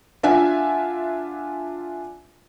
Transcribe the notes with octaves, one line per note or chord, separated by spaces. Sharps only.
D4 F4 E5 F#5 G#5